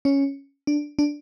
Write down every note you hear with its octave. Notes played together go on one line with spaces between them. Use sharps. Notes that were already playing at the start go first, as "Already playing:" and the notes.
C#4
D4
D4